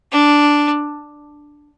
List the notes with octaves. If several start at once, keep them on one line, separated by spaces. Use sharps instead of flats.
D4